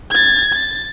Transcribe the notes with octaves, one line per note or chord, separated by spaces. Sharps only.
G#6 A6
A6